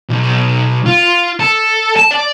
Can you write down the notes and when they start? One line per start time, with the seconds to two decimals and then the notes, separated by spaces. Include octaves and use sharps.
0.09 B1
0.86 F4
1.40 A4
1.96 A5
2.11 D5